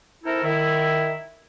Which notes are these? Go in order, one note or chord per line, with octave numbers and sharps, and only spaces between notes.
C4 D#4 E4 A4 A#4 E5
D#3 E4